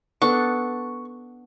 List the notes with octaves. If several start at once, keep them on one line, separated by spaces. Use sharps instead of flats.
B3 D4 A4 C#6